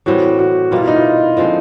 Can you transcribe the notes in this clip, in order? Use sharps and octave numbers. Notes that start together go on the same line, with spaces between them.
A2 E3 G3 C4 F#4
F#4
B2 G3 A#3 F4
E4
D#4
F4
D3 F3 G#3 C4